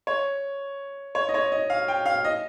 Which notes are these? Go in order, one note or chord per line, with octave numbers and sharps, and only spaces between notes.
C#5
C#5
D#5
C#5
D#5
F5
G5
F5
D#5